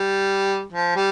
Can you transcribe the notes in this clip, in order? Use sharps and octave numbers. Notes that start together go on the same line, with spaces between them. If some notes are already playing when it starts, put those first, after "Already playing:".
Already playing: G3
F3
G3